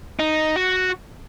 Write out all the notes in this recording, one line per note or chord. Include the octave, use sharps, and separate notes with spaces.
D#4
F#4